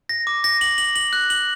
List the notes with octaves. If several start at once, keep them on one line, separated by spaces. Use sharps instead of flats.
A#6
D6
A#6
F#7
F#7
F#7
F#6
F#7